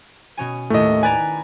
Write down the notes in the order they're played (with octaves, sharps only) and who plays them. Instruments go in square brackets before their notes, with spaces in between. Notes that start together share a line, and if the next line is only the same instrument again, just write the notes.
[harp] B2 C#4 G#5
[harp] D#2 A2 [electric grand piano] A3 D#5
[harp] B4 D5 A#5 [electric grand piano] G#5